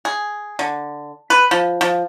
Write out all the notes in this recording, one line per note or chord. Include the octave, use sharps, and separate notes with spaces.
G#4
D3
B4
F3
F3